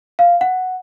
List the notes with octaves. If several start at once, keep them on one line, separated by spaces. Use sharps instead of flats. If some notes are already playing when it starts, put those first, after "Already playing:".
F5
F#5